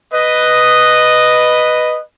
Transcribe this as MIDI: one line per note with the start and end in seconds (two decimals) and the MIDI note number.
0.13 2.01 71
0.13 2.01 75